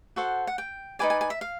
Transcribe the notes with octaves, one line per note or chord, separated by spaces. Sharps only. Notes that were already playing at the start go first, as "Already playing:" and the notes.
F#4 A4 C5 F#5
F#5
G5
D#4 G#4 B4 D5 G#5
G#5
G#5
E5
F5